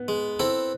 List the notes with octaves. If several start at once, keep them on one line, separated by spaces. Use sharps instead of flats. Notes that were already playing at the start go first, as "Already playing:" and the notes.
Already playing: B3
G#3
C4 E4 A4